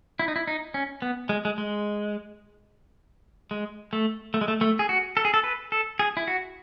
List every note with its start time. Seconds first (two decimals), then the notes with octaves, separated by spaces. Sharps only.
0.19 E4
0.28 D#4
0.36 E4
0.48 D#4
0.74 C#4
1.02 B3
1.29 G#3
1.45 G#3
1.58 G#3
3.51 G#3
3.93 A3
4.34 A3
4.41 G#3
4.48 A3
4.61 A3
4.79 G#4
4.89 F#4
5.17 A4
5.25 G#4
5.34 A4
5.44 B4
5.72 A4
5.99 G#4
6.17 E4
6.28 F#4